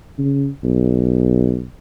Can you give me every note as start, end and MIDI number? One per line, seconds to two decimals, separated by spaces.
0.18 0.48 49
0.64 1.65 35